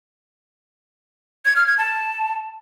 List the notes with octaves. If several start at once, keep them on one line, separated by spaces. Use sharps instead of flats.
G#6
F6
G#6
A5